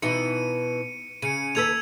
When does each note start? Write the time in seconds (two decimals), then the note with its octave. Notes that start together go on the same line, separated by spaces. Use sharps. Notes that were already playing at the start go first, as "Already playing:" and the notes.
0.02 B2 E3 D#4 C#7 D#7
1.22 C#3 C#7 D#7
1.55 D#2 A4 B4 E6 G#6 F7